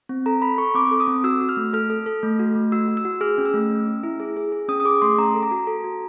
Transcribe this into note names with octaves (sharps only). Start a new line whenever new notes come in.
C4
A4 A#5
A4 B5
A4 C#6
C4 D6
A4
D#6
C4
F#4 E6
F#4
F6
A3
A4 F6
A4
A4
A3
F#4
A3
F#4 E6
F#4
E6
F#4
G#4 F6
C#4
E6
A3
C#4
C#4
E4
G#4
G#4
G#4
C#4 D#6
D#6
G#4 D6
A3 C6
C#4 A#5
A4
A#5
F#4
A4
F#4